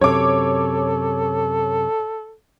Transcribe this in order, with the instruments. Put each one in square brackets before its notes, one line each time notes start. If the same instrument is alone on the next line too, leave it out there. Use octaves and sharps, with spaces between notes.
[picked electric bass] F#2 C3 [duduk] A4 [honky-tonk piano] C#5 D6